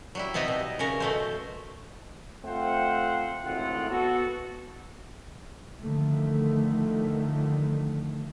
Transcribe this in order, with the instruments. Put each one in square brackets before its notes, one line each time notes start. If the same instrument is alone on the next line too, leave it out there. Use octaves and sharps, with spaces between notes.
[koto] F#3 G3 E4
C3 B3 D#4 E4 D#5
B2
C#3 F#3 C#4 A#4
B2 A3 C5
[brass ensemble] A3 C4 F4 C5 F#5
G#1 D2 A2 C4 F4 F#5
B3 F#4 A4
[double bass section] D3 D#3 F3 A3